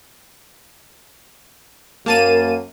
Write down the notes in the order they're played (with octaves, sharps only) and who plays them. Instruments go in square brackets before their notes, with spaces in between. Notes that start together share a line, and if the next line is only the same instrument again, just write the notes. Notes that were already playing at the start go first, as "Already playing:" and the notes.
[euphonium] F#2 [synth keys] A#3 A5 D#7